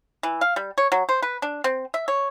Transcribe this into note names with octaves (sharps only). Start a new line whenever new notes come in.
E3
F5
G3
C#5
F#3
C5
B4
D4
C4
E5
C#5